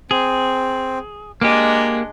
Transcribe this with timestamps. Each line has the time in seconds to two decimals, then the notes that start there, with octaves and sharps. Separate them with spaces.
0.11 C4 G#4
1.41 G#3 A#3 D4 G4 A#5